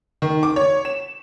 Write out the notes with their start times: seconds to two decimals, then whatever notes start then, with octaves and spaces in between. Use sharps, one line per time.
0.22 D#3
0.43 D6
0.56 C#5
0.85 E7